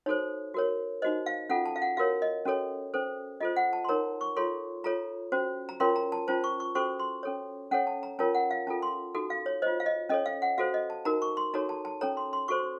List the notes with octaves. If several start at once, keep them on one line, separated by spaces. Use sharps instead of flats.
D#4 F#4 A4 C5 C#5
F#4 A#4 C#5
D#4 F#4 C5 D#5
F5
C#4 F4 A4 F#5
A5
F5
F#5
F#4 A#4 C#5 F5
D#5
C#4 F#4 A4 C#5
C#4 A4 C5
F4 A4 C5 D#5
F#5
A5
C6
D#4 A#4 C#5 A#5
C#6
F4 A4 C#5 C6
F4 A4 C#5 A#5
C#4 F#4 C5
A#5
C#4 F4 A#4 C#5 C6
A#5
A5
C#4 F4 C5 A5
C#6
C#6
C#4 F#4 A4 C5 C#6
C6
C#4 A4 C#5
C#4 A4 C#5 F#5
A5
A#5
C#4 F4 A#4 C#5 A5
F#5
F5
C#4 F4 A4 A5
C6
D#4 F#4 A4
F5
C#5
F4 C5 D#5
F5
D#5
C#4 A4 C#5 D#5
F5
F#5
F#4 A4 C5 F5
D#5
A5
D#4 F#4 A#4 A#5
C#6
C6
D#4 F#4 A4 C#5 A#5
A5
A5
C#4 A4 C#5 A#5
C6
C6
F#4 A4 C5 C#6